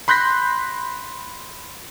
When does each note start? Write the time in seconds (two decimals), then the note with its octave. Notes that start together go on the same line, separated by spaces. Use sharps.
0.08 B5 C6 F#6 G6 A#6 B6